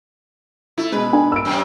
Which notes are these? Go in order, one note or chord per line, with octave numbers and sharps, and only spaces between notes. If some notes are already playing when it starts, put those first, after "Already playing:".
A3 E4
B2 G#3 B4
D4 G#5
E6 D7
F#2 C3